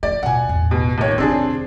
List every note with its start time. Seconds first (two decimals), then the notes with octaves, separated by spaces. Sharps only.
0.03 F3 A3 D5
0.23 D#2 B2 F#5 G#5
0.49 A1 E2
0.71 B2
0.98 D#2 C#5
1.18 F1 D#3 C4 D4 G#4